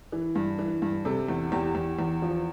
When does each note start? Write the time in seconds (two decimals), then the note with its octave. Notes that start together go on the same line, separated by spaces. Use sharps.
0.12 E3
0.35 G2
0.59 E3
0.82 G2
1.05 C3 A4
1.29 E2
1.52 E2 G4
1.75 E2
1.99 E2
2.22 F3